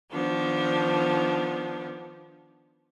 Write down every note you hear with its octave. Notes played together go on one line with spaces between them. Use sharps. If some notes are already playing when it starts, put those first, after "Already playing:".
D#3 F3 B3 D4